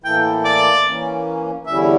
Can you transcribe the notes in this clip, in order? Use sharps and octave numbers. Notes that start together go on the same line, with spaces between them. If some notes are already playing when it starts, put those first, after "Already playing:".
A2 E3 A#3 E4 A4 G5
D5
E3 A#3 C#4
E2 D3 G3 C#4 E4 E5